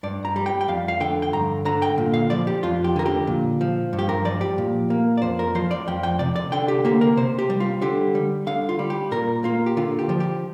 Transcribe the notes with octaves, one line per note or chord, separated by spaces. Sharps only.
G2 D5
A#5
G3
G5
G5
F2 F5
F5
D3 G5
G5
G2 A#5
D3 A#5
G5
A#2
F5
F3 D5
G4
F2 F4
G4
D3 A#4
G4
A#2
F3
G2
G4
A#4
F3 D5
G4
A#2
A#3
D5
F2 C5
A#4
F3 C5
D5
F2 G5
G5
C3 D5
D5
D3 G5
G4
A#3 G4
A#4
C3 C5
G4
G3
F4
D3 G4
G3
D3 F5
F4
G3
G4
A#2 A#4
A#3 F4
G4
D3 F4
G4
F3
G4